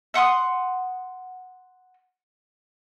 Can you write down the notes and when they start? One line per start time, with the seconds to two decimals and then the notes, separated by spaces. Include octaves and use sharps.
0.14 E5 F#5 C6 D#6